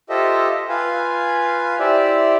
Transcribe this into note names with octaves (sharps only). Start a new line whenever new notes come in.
F4 G4 A4 C5 D#5 E5
F4 B4 F5 G#5
E4 G4 C5 D5 E5